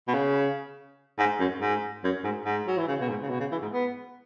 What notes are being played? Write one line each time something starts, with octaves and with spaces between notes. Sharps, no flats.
B2
C#3
G#2
F#2
G#2
F#2
G#2
G#2
F#3
E3
C#3
B2
G#2
C#3
B2
C#3
E3
G#2
B3